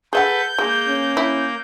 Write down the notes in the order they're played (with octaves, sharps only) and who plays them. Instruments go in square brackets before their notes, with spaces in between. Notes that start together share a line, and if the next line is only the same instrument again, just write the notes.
[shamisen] G#4 E5 F#5 [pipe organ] A4 B4 [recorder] G6
[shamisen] G#3 [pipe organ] A#3
[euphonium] C#4
[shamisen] E4